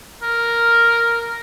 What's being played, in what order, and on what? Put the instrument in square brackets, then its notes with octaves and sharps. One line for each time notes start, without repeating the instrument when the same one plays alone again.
[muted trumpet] A#4